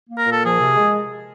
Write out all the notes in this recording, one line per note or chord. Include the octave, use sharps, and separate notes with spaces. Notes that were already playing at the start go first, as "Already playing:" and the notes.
A#3
A#4
A#2 A4
F3 G#4
C3
G#3